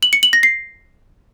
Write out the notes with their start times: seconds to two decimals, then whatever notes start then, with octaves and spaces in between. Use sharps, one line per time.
0.03 F#7
0.13 C#7
0.23 F#7
0.33 A#6
0.43 C7